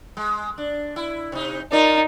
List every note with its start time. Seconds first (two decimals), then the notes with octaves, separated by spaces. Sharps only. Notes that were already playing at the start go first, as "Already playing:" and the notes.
0.17 G#3
0.58 D4
0.96 E4
1.32 C3 D#4
1.72 D#4 F4 A#4 D5